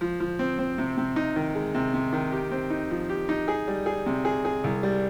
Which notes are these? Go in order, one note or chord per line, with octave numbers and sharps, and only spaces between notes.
F3
F3
C4
C4
C3
C3
D#4
D#3
G#3
C3
C3
D#3
G4
C4
D#4
F3
G4
D#4
G#4
G3
G#4
C3
G#4
G#4
C2
G3